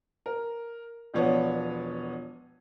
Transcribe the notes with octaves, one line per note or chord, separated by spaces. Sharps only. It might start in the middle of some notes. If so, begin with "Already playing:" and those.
A#4
E1 F3 B3 C#5 D5 F#5